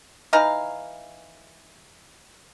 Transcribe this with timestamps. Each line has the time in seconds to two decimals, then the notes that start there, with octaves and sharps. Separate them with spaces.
0.33 E3 D#4 F5 A#5